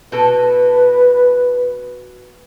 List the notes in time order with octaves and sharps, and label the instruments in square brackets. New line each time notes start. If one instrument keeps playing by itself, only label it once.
[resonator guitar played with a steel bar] B2 A4 [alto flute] B4